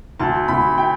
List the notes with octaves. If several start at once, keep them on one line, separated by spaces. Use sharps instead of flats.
D2 A5
D2 B5
G5